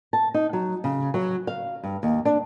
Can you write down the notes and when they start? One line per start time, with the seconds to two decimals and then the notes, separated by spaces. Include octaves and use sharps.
0.13 A5
0.34 D#4
0.53 F#3
0.84 C#3
1.14 F#3
1.47 F5
1.83 G2
2.03 D#2
2.25 D4